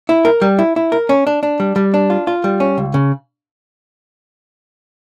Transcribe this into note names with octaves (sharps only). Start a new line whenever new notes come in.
E4
A#4
G3
E4
E4
A#4
C#4
D4
D4
G3
G3
D4
F4
F4
G3
C#4
C#2
C#3